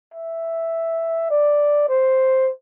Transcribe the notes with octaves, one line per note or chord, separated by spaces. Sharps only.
E5
D5
C5